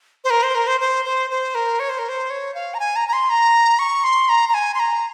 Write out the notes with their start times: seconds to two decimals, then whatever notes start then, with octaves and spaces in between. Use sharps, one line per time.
0.24 C5
0.30 A#4
0.43 C5
0.55 A#4
0.67 C5
0.80 C5
1.05 C5
1.30 C5
1.55 A#4
1.79 C#5
1.89 C5
1.99 A#4
2.09 C5
2.30 C#5
2.54 F5
2.74 A#5
2.79 G#5
2.96 A#5
3.08 A#5
3.13 C6
3.30 A#5
3.79 C#6
4.04 C6
4.29 A#5
4.49 A#5
4.54 G#5
4.74 C6
4.79 A#5